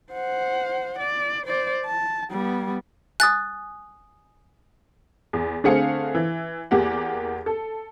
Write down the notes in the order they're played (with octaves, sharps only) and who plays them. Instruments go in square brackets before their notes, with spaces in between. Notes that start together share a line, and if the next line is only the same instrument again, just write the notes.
[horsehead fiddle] C5 F#5
D5
C5 D5
A5
G3 B3
[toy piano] G#5 D#6 [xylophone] F#6 A6
[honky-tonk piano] E2
D3 A3 C4 G#4 F5 C#7
E3
E2 A#3 G4 F#5
A4